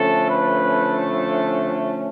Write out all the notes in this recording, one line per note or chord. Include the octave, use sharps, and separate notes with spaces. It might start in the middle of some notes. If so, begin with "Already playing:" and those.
Already playing: D3 F3 A3 C#4 A4
B4